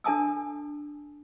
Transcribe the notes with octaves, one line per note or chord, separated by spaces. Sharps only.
D4 A4 G#5 A5 D#6 E6